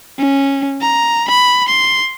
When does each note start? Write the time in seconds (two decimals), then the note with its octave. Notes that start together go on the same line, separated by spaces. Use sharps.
0.19 C#4
0.81 A#5
1.28 B5
1.69 C6